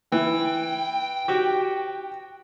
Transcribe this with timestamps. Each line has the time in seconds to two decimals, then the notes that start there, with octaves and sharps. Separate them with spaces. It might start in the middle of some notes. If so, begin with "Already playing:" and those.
0.12 E3 G5
1.28 F#4 G4